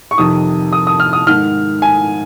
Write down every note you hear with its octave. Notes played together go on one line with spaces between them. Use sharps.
C#6
F2 C3 D#3 D#6
D#6
D#6
F6
D#6
G#2 D#3 F6
G#5